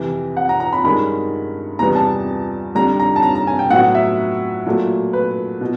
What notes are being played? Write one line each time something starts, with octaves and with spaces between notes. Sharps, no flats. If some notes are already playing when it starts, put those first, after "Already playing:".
Already playing: F2 C3 E3
F#5
A#5
A#5
B5
G2 D#3 G#3 C#4 B5
E2 C3 E3 G3 B3 A#5
A5
F2 D3 G3 A#5
A#5
A5
A#5
A#5
G#5
G5
A2 F#3 B3 F#5
E5
A#2 F#3 A3
B4
B2